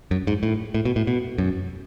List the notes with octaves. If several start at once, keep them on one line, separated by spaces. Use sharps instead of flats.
F#2
G#2
A2
A2
B2
A2
B2
F#2